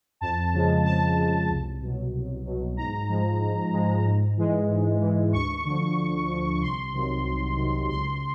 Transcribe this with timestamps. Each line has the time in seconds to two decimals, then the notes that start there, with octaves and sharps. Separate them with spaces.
0.21 F2 A5
0.53 C#3 F3 G#3
0.85 F2 A5
1.17 C#3 F3 G#3
1.49 C2
1.81 B2 F#3
2.13 C2
2.45 B2 F#3
2.77 G#2 A#5
3.09 F3 G#3
3.41 G#2
3.73 F3 G#3
4.05 G#2
4.37 E3 G#3
4.69 G#2
5.01 E3 G#3
5.33 D2 C#6
5.65 D3 F3
5.97 D2
6.29 D3 F3
6.60 C2 C6
6.93 C3 D#3 F#3
7.25 C2
7.57 C3 D#3 F#3
7.89 C#2 C6